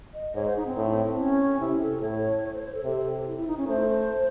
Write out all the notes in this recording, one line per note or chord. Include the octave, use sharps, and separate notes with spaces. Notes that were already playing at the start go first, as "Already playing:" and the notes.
D#5
G#2 C#5
C5
D#4
C4
A2
C#4
C3 E4
A4
A2 C#5
C#5
C5
C5
A4
C3 A4
E4
E4
D#4
C#4
A3 C5